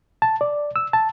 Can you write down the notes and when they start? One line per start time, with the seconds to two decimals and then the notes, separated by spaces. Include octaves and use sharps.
0.22 A5
0.41 D5
0.76 E6
0.93 A5